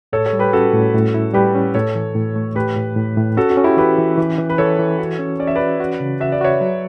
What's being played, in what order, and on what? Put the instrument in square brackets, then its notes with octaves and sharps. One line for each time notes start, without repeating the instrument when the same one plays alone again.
[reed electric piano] A2 [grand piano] A4 C#5
[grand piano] A4 C#5
[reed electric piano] G3
[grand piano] G4 B4
[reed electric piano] C#4 [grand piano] F#4 A4
[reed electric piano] A2
A2
E4
[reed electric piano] G3 [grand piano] G4 B4
[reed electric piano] C#4
[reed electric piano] A2 [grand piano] A4 C#5
[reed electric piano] E3
A2
A3
[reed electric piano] A2 [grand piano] G4 B4
[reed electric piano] A2
A2
A2
[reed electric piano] C#4 [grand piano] F#4 A4
[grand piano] F#4
[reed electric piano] C#4
[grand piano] E4 G4
[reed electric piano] E3 [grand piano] G4 B4
[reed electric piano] E3
E3
E3
[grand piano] B4
[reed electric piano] E3 [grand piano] A4 C#5
[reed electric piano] E3
F#4
C#4
[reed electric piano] C#4 [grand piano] D5
[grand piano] E5
[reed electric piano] F#4 [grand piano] B4 D5
[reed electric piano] F#4
C#3
[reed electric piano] F#4 [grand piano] E5
[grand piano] D5
[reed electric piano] F#4 [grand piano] C#5 E5
[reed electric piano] F#3